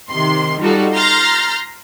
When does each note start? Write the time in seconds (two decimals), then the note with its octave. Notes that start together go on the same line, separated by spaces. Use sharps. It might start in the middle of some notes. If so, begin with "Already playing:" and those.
0.10 C3 D#3 C6
0.60 G3 D#4 F4 F#4 A4
0.93 A#5 C6 F6 G6 A6 A#6